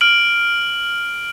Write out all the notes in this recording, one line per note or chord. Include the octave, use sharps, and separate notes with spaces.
F6 D7 F#7